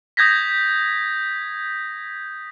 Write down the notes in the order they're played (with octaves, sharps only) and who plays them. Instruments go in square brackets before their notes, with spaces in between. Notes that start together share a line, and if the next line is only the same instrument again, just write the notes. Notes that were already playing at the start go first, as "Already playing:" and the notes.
[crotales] D#6 G6 G#6 A#6 B6